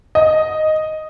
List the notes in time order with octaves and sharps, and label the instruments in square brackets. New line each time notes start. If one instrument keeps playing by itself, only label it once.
[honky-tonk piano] D#5